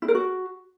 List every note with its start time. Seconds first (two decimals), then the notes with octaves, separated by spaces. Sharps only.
0.02 E4
0.08 A#4
0.15 F#4